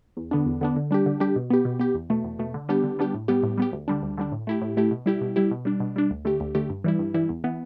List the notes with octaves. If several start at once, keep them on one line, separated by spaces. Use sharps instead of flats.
E2
D3 B3 D4
E2
D3 B3 D4
D3
G3 D4 G4
D3
G3 D4 G4
B2
B3 G4
B2
B3 G4
E2
B2 A3
E2
B2 A3
D3
G3 B3 D4 G4
D3
G3 B3 D4 G4
A2
G3 B3 G4
A2
G3 B3 G4
D2
D3 G3 D4
D2
D3 G3 D4
A2
A3 E4 G4
A2
A3 E4 G4
B2
G3 E4 G4
B2
G3 E4 G4
B2
G3 D4
B2
G3 D4
D2
D3 A3 G4
D2
D3 A3 G4
G2
E3 G3 E4
G2
E3 G3 E4
E2
E3 B3